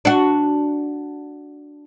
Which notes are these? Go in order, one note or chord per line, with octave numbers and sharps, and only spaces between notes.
D4 F#4